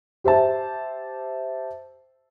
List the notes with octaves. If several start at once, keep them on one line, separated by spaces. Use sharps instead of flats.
G4 C5 E5 A5